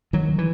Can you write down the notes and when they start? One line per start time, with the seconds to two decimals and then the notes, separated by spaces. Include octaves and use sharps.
0.13 D#3 F#3
0.38 E3